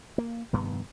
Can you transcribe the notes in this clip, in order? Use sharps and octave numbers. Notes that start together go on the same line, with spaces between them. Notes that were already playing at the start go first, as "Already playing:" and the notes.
A#3
F1 G2 D#3 B3